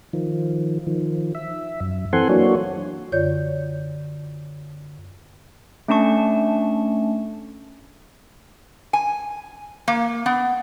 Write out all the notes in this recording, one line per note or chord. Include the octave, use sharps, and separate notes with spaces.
D#3 F3
D#3 F3
E5
F#2
E3 C4 A4 F#5 G#5 C6
E3 F#3 A#3 D4 F#4 C#5
F#2 D3 F4 C#5 D5 G6
A3 C#4 D4 A5 C#6
G#5
A#3
B3